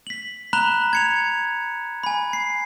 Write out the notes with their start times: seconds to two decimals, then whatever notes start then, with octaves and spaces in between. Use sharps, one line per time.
0.07 B6 F#7
0.53 A#5 B5 F#6 E7 G7
0.93 G#6 C#7 F7
2.03 G#5 B5
2.33 C7